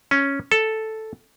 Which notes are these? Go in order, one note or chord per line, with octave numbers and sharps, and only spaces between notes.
C#4
A4